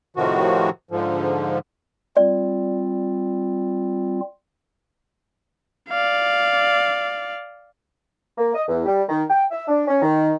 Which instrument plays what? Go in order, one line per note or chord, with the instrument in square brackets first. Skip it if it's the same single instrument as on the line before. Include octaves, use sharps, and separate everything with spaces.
[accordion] A2 C3 D#3 F3 F#4
G#2 D3 F3
[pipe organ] G3 C4 F4 [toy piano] D5
[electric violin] D5 F5
[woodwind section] A#3
D#5
E2
G3
D#3
G5
E5
D4
C#4
D#3